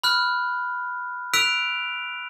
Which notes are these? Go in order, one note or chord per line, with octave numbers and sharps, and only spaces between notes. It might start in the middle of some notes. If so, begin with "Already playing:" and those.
B5 F6 F#6
E6 F#6 B6 D7 F7